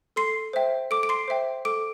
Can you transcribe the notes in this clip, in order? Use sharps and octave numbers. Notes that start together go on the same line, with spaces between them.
A4 C6 C7
C5 E5 G5
A4 D6 D7
D7
C6 C7
C5 E5 G5
A4 D6 D7